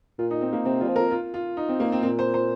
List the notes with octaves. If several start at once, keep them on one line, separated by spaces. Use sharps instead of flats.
A#2 F4
D#4
C4
A#3
C3 C4
F4
G3
F3
A#4
F4
F4
D#4
C4
A#3
C4
A#2 C4
C5
C5